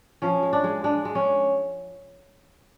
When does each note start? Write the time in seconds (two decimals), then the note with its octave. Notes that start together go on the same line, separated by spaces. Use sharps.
0.22 F3 C#4
0.43 G#3
0.53 D4
0.64 G#3
0.84 G#3 D4
1.05 G#3
1.15 C#4